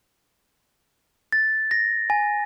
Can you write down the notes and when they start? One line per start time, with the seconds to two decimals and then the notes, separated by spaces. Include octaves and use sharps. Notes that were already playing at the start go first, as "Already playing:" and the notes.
1.32 A6
1.71 A#6
2.10 G#5